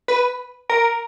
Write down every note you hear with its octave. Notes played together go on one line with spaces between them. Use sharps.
B4
A#4